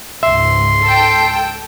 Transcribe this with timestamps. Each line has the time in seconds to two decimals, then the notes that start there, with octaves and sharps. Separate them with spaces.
0.23 C#2 G#2 E5 C6
0.83 A4 G5